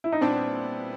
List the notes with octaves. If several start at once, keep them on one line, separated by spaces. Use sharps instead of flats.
E4
D#4
A#2 G3 B3 C4 D4 E4